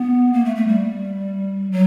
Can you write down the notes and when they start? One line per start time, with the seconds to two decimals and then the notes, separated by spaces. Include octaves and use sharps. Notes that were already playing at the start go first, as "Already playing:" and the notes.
Already playing: B3
0.33 A#3
0.45 A3
0.56 A3
0.68 G3
1.72 F#3